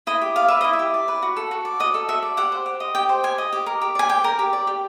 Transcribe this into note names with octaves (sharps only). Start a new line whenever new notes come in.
E4 D#5
G4
D5 F5
B4 E5
E4 D#5
E5
G4
D5
B4
F#4
A4
F#4
D5
F#4 D#5
A4
F#4 E5
D5
G4 F#5
C5
G4
D#5
G4 G5
C5
G4 G#5
D#5
G4
A#4
G4
D5 G#5
G4 G5
A#4
G4
D5
G4